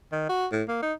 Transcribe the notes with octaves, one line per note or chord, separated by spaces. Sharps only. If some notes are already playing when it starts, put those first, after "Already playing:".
D#3
F#4
A2
A#3
D#4